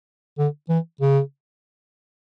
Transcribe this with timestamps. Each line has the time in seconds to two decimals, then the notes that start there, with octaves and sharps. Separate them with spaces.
0.38 D3
0.69 E3
1.01 C#3